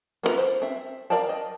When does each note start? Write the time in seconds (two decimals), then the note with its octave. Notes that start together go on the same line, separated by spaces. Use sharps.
0.23 A#3 B3 F4 A#4 B4
0.38 C5
0.62 C4 E5
1.10 A#4 D5 F5 G5 A5
1.29 D#5